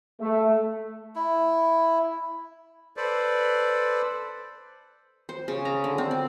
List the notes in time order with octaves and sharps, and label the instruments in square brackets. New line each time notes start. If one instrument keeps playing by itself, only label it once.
[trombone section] A3
[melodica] E4
[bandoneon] A4 B4 C5 D5
[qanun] C5
C#3
A#5
D3
C4
D5